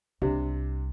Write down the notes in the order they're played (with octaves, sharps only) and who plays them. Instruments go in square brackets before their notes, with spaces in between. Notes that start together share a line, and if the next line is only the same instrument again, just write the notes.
[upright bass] C2 [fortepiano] C3 D4